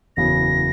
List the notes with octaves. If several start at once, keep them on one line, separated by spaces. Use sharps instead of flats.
F#1 E2 C#3 F#3 B3 A#6